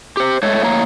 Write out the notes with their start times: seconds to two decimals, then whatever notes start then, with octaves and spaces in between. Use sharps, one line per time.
0.17 G4 C5
0.43 G#3 A3 C#5
0.62 A2 A#3 C#5 A#5